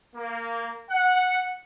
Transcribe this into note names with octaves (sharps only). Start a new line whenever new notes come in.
A#3
F#5